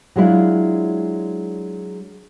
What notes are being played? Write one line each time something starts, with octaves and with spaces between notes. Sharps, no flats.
F#3 G#3 D4 E4 F4